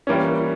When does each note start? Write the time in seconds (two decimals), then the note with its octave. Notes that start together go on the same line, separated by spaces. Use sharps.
0.07 E3 G3 A#3 C#4